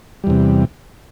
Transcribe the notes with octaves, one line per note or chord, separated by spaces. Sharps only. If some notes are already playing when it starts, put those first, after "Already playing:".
E2 C3 G3